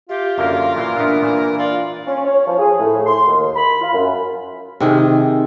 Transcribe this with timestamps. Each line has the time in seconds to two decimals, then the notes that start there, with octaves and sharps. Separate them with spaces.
0.09 F4 G4 E5
0.38 F#2 D3 A#3 A#4 E5 F5
0.76 A#2 E3
0.96 A#2 B3 D4 E5
1.23 A#2 E3
1.58 F4 D5
2.07 C#4
2.25 C#5
2.47 F3
2.59 G#4
2.79 A2
3.06 C6
3.27 D#2
3.56 B5
3.82 F4
3.94 F#2
4.80 C3 D#3 G#4